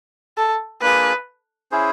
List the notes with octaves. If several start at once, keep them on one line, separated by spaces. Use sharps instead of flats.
A4
A#3 D4 F4 G#4 B4
C#4 E4 G#4 C5